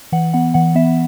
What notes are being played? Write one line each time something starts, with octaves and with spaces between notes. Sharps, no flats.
E3 F#5
B3 F#5
E3 F#5
B3 E5